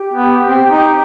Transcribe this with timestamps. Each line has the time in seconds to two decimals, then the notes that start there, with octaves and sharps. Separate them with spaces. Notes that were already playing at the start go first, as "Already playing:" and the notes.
Already playing: G4
0.13 B3
0.47 C4
0.69 D#4